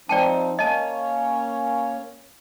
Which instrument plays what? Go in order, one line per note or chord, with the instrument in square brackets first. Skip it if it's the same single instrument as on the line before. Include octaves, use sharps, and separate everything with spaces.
[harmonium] F3 C4 D#4 [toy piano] D5 G5 A5
[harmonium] A#3 C#4 C#5 [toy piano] D#5 A5